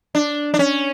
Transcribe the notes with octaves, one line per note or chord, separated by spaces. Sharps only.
D4
D4
C#4